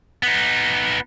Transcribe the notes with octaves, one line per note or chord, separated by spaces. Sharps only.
B3 D#4